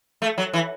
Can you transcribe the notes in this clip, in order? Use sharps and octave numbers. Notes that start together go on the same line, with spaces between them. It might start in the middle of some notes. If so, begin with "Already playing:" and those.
A3
F#3
E3